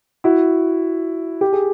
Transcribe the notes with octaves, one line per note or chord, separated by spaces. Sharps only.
E4 F#4
G4
G#4